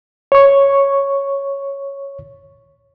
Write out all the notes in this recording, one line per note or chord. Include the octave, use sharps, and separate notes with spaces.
C#5 C#6